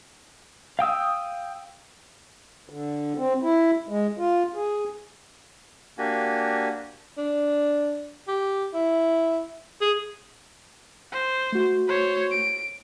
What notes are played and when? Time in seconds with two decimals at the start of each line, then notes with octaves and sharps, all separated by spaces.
0.79 F5 G5 D#6 E6
2.69 D3
3.17 C4
3.42 E4
3.89 G#3
4.18 F4
4.55 G#4
5.98 A#3 D4 F#4 G4 G#5
7.17 D4
8.28 G4
8.74 E4
9.81 G#4
11.12 C5
11.52 A3 F#4
11.88 C5 C#5
12.31 D7